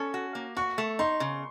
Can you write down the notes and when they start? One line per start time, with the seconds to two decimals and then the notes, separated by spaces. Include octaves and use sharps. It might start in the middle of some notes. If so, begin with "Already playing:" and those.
Already playing: C#4 A4
0.14 F#4
0.35 A#3
0.56 F#4 C#6
0.78 A3
0.99 D#4 C6
1.20 C#3